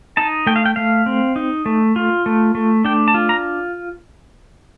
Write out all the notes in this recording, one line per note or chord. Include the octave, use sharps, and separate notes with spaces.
D#4 A5
A3 G5
F5
G5
A3 F5
C4
D#4
A3
F4
A3
A3
D4 G5
A5
F4
A#5